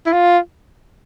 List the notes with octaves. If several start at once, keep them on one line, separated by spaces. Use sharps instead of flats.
E4
F4